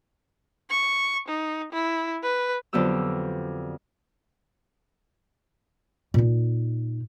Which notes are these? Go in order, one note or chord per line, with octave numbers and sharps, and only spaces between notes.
C#6
D#4
E4
B4
F2 D3 F#3 B3 G4 E6
A#2 D#4